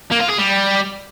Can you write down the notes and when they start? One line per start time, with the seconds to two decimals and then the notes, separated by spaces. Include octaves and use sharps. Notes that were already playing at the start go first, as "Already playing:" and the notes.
0.11 A#3
0.20 F4
0.29 G#4
0.38 G3